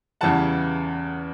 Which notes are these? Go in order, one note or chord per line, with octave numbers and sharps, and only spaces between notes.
E2 C#3 E3 G3 F#5 A5